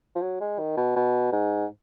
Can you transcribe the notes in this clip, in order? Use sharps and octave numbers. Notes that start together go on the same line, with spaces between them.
F3
F#3
G#3
D#3
B2
B2
G#2